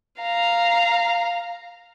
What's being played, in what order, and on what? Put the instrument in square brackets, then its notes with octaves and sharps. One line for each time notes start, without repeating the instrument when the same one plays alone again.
[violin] F5 A#5